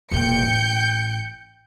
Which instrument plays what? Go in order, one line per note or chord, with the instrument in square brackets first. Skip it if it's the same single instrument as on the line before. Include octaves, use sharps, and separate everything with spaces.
[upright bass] E1 A#2 [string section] G5 G6 C#7
[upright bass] A1